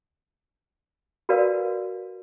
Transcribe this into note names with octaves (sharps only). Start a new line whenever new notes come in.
F#4 A#4 B4 D5 F5